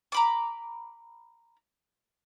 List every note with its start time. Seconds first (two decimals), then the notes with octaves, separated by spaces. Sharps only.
0.12 A#5 B5 D6